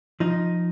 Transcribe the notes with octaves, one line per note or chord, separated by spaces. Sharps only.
F3 D#4